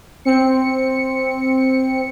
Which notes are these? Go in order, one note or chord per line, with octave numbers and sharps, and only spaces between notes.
C4 C#7